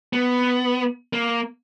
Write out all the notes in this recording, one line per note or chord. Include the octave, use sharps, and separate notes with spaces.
B3
A#3